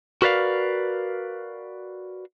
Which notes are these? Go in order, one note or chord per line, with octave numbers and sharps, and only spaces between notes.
F#4 A#4 B4 D5 F5